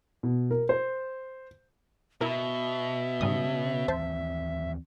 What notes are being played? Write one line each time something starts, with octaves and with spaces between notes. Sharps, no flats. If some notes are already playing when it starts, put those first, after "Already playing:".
B2
A#4
C5
B2 E4 A#4 E5
G#2 C#3 G3 D#6
D#2 E3 C4 C5 A5